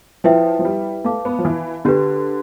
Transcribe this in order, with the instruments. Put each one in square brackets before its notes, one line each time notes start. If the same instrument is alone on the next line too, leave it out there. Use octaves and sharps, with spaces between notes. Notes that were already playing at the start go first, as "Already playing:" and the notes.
[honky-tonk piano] F3 [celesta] E4 B4 E5 G5
[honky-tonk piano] F3
G3
[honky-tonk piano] A3 [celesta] B4 F5 A5 D6
[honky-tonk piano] B3
F3
E3
[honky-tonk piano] D3 [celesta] D4 G4 B4